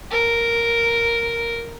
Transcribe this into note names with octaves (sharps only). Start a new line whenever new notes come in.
A#4